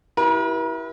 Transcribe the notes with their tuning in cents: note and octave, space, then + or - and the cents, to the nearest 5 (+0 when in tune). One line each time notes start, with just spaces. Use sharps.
E4 +0 G4 -30 A#4 +45